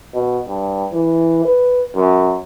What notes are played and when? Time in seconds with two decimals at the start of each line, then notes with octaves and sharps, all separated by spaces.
0.14 B2
0.47 G2
0.92 E3
1.45 B4
1.96 F#2